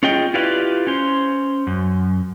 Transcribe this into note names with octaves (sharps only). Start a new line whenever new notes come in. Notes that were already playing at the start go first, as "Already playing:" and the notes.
C#4 F4 G#4 D#5 G5
E4 F4 G4 B4 D5 F5
C#4 C5
F#2